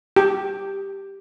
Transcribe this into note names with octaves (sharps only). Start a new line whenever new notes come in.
G4